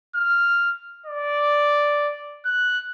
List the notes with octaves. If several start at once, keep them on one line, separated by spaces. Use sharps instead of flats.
F6
D5
F#6